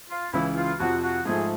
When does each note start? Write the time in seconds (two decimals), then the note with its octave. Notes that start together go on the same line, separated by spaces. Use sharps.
0.10 F4
0.33 C#2 C#3 E3 E4
0.56 F4
0.79 F2 C3 F3 F#4
1.02 F#4
1.26 G#2 F3 A3 G#4